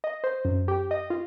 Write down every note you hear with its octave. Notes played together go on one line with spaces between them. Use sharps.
D#5
C5
F#2
G4
D#5
F4